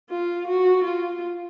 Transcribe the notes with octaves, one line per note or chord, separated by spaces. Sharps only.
F4
F#4
F4